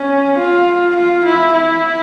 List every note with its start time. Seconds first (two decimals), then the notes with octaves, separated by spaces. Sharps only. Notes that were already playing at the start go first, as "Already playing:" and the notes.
Already playing: C#4
0.38 F4
0.95 F4
1.24 E4
1.52 E4